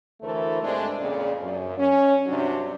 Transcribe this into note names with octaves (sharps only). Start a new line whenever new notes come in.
D2 E3 A3 A4 A#4 C5
G2 G#3 A3 C4 D4
F2 A#2 C#3 D5
F#2
C#4
G2 C3 F#3 D4